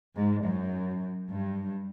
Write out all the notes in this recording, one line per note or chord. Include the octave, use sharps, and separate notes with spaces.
G#2
F#2
G2